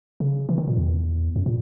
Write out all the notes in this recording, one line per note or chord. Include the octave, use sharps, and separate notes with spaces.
C#3
E3
D#3
A#2
E2
F#2
A#2